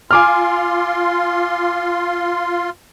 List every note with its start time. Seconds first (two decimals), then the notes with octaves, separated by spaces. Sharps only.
0.11 F4 G#5 C6 D6 F6